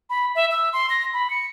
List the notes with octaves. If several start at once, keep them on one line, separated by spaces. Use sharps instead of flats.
B5
E5
E6
C6
A#6
B5
C#7